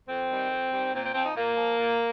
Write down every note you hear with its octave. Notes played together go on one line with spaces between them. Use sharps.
F2 C4
D#3 G3
F2
D#3 G3
A#2 C4
C4
F3 C4
D#4
A#2 A#3
F3
A#2